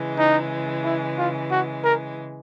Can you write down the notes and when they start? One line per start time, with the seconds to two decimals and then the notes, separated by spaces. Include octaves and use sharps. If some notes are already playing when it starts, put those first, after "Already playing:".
Already playing: C#3 E3 G#3
0.18 D#4
0.85 E4
1.18 F4
1.51 F#4
1.84 A#4